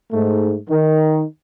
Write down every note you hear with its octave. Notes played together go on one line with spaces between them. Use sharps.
G#2 A3
D#3